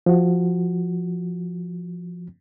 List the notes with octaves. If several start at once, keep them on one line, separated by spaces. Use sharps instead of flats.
F3 F#4